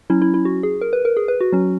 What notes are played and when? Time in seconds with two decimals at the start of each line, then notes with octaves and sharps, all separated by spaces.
0.10 F#3 C#4 E4
0.22 E4
0.34 E4
0.45 F#4
0.63 G#4
0.81 A#4
0.93 B4
1.05 A#4
1.17 G#4
1.28 B4
1.41 F#4
1.52 F#3 C#4